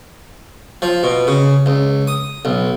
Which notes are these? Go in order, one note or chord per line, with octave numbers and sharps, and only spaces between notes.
F3
B2
C#3
C#2
D#6
B1